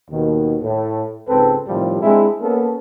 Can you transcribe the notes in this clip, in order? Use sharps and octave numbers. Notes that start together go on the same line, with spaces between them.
D#2 B2 D#3
A2
C#2 G#2 C4 A4 B4
A2 C3 D#3 F3 G3
G#3 C4 D4 E4
A#3 B3 C#4 A4 A#4